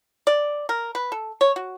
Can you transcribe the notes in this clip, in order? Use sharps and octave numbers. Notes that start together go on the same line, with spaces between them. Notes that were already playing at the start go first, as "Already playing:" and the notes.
D5
A#4
B4
A4
C#5
F#4